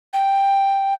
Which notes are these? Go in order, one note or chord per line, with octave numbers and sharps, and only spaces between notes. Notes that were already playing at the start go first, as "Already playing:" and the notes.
G5